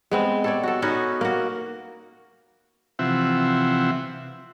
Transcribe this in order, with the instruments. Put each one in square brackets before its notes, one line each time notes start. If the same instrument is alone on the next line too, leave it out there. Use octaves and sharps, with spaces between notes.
[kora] G#3 B3 C4
A4 C#5 D5
F#4 A4
B3 C#4 D#4 F#4
A#3 F#4
[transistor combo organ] C3 E3 F3 C4 E5 F#5